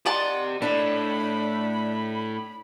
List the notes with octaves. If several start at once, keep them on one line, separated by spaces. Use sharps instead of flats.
D#3 G4 D5 F#5 A5 C6
A2 D4 B5